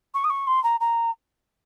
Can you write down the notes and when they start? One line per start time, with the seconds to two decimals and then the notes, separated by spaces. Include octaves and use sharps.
0.14 C#6
0.24 D#6
0.30 C#6
0.47 C6
0.63 A#5
0.80 A#5